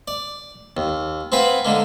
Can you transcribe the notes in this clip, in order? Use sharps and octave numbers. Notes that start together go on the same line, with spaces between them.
D5
D#2
C4 G#4 B4 F5 F#5
D3 G#3 A#3